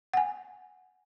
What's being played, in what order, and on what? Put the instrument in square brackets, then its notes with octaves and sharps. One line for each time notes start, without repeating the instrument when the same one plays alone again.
[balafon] F#5 G#5